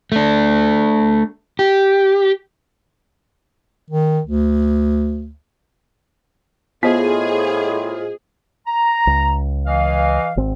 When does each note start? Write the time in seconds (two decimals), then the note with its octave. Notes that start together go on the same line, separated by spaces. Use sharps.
0.12 A3 D4
1.59 G4
3.90 D#3
4.26 D2
6.83 A2 B3 F4 G#4 C5 D#5
8.66 A#5
9.07 C#2
9.65 E3 D#5 F5
10.37 G#1 C4